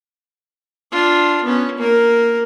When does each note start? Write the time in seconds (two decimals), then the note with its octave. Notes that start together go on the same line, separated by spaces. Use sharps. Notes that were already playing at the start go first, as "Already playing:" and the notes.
0.92 D4 F4
1.44 B3 C#4
1.78 A#3 A#4